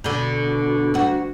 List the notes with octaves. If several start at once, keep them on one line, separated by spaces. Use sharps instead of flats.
B2 D3
D2 F#4